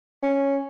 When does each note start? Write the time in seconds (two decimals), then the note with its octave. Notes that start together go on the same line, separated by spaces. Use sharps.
0.23 C#4